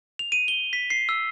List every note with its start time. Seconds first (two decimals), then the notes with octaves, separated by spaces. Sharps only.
0.19 F7
0.32 D#7
0.48 G7
0.73 B6
0.90 C7
1.09 E6